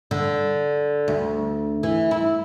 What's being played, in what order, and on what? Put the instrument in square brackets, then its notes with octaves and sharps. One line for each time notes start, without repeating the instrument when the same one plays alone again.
[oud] D3
D2
E3
E4